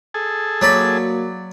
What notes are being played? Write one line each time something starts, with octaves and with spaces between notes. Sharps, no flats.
G#4 A4
F#3 A#3 F#4 D5 B5